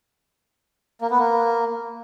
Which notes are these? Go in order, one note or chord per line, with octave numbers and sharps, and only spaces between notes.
A#3
B3
A#3